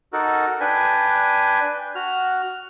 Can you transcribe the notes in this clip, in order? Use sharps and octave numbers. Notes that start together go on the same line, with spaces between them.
D#4 F#4 A4 A#4
D4 B4 G5 G#5
F#4 F6